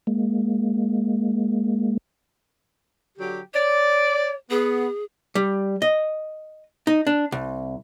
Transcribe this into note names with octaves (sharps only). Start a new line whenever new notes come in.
G#3 A#3
D3 F#3 G4
C#5 D5
B3 G#4
G3
D#5
D#4
D4
C2